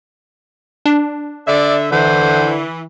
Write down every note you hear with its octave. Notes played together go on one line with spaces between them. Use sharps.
D4
D3 D5 E5
D3 E3 C5